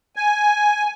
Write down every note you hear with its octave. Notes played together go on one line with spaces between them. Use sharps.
G#5